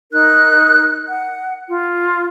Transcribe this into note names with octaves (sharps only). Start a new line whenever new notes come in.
D#4 A#4 F#6
F#5
F4